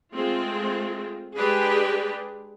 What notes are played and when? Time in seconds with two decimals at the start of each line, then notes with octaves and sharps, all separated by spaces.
0.13 G#3 A3 C4 F4
1.36 G#3 D4 G4 G#4 B4